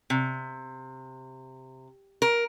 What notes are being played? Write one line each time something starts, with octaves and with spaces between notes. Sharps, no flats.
C3
A#4